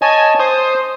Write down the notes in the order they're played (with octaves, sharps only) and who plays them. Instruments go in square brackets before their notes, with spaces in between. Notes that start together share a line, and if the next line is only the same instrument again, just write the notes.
[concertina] C#5 D#5 A5 [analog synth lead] G#5
[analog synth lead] C5 [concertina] D#6